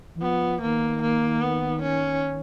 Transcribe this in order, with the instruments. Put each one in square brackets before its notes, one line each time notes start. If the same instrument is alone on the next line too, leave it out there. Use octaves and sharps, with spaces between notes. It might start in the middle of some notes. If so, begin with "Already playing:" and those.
[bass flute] E3
[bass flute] F3 [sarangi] B3
[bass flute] D#3 [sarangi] A#3
[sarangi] A#3
B3
C#4